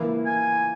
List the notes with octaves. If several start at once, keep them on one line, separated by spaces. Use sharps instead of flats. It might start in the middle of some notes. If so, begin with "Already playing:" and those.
Already playing: E3 A#3 E4
G#5